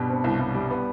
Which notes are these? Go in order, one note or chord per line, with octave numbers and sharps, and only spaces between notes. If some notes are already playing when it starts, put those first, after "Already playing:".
Already playing: G2 B2 G3
C4
C2
C2
G3
B3